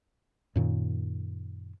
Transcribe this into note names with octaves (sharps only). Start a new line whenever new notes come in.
F#2 A#2 D#3